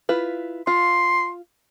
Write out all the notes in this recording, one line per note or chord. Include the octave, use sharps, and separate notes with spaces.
E4 F4 B4
F4 C6